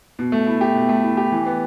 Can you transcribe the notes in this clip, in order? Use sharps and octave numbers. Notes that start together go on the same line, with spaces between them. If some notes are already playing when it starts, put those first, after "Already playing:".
B2
A3
E4
G4
B2
A3
E4
G4
E3
B3